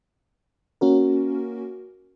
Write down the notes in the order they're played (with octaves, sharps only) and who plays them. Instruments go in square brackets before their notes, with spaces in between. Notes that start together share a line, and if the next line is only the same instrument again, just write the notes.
[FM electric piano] A#3 C#4 F#4 A#4